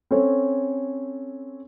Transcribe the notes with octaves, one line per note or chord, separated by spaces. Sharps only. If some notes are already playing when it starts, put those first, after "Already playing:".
C4 C#4 A4 C#5